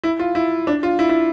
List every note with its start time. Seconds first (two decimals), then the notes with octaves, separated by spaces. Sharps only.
0.03 E4
0.19 F4
0.35 E4
0.67 D4
0.83 F4
0.99 E4
1.09 E4